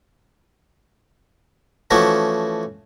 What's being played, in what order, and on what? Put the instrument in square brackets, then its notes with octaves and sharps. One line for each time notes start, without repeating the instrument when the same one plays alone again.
[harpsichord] E3 F3 A3 C#4 F#4